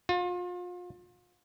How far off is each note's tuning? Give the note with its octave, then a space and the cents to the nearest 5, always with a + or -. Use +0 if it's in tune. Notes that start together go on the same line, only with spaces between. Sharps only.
F4 +35